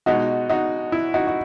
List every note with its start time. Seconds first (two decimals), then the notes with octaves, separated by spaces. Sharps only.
0.06 B2 G#3 D#4 F#4
0.49 D#4 F#4
0.92 E4
1.14 D#4 F#4
1.27 F#4